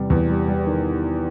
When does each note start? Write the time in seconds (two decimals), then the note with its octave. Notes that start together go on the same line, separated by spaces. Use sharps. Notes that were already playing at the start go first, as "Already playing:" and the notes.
Already playing: E2 C3 G3
0.10 E2
0.29 G3
0.48 G3
0.67 D#3